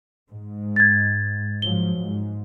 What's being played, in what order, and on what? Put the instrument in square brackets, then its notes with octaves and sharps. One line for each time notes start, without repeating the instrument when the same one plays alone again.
[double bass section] G#2
[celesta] G#6 A6
[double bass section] G#2 F3 F#3 [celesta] G7
[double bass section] G#2